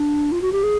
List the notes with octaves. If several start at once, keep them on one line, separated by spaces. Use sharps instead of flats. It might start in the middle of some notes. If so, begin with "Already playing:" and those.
Already playing: D4
F4
F#4
G4
G#4